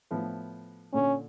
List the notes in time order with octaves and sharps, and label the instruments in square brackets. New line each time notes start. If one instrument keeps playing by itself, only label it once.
[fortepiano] A2 F3 B3
[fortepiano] A#2 D3 [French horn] C#4